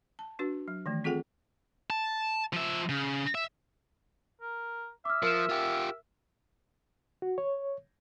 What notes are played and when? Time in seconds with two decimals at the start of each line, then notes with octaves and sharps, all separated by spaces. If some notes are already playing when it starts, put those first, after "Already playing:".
0.19 A5
0.39 D4 F#4 B4
0.68 F#3
0.86 D#3 E3 A3
1.04 C4 F4 G#4 A4 F#5 G5
1.90 A5
2.53 F3 E5
2.89 C#3
3.35 E5
4.41 A#4
5.05 E5 D6 F6
5.23 F3 A#4 F6 E7
5.49 F4 G4
7.22 F#4
7.38 C#5